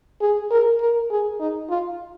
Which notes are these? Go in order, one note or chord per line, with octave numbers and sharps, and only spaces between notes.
G#4
A#4
A#4
G#4
D#4
F4